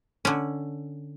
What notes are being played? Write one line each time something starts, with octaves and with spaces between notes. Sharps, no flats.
D3 C#4